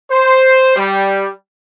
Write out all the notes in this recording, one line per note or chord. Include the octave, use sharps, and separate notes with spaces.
C5
G3